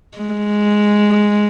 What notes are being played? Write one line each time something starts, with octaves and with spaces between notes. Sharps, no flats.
G#3